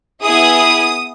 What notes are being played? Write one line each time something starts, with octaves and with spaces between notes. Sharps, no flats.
B3 E4 G#4 D#6